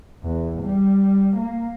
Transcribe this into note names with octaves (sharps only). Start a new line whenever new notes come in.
E2
G3
A#3